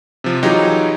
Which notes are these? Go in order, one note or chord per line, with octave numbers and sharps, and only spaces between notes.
C3 F3
E3 F#3 D#4 F4 G4 G#4